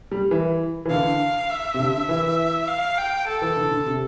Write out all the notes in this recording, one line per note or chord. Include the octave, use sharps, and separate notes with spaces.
G3
E3
E3
D3 F5
E5
C3
D3
E3
F5
G5
A4
E3
D3
D3
C3